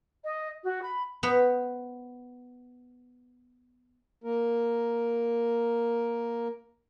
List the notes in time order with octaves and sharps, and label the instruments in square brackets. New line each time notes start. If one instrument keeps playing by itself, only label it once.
[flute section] D#5
F#4
B5
[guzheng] B3 B4 C5
[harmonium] A#3 A#4